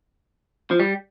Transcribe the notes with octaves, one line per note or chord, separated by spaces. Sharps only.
F3
G3